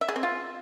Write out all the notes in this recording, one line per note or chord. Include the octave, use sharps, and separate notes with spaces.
E5
G#4
C4
F4